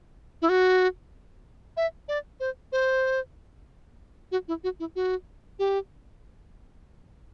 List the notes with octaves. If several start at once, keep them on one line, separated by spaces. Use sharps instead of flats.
E4
F#4
E5
D5
C5
C5
F#4
E4
F#4
E4
F#4
G4